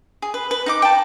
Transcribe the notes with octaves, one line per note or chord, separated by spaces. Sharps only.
G#4
B4
B4
D#4 F#5 D6
G5 A5